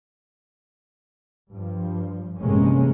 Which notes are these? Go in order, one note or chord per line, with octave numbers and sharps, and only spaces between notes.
G2 F3
A1 G2 C3 G#3 A#3 C#4